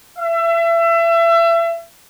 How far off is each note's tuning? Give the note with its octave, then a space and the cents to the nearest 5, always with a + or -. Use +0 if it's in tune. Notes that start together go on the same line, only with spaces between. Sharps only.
E5 +30